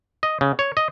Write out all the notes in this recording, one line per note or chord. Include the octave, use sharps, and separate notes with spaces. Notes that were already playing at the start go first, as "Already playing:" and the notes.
D#5
C#3
C#5
D#5